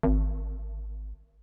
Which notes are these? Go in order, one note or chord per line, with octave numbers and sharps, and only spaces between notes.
G#1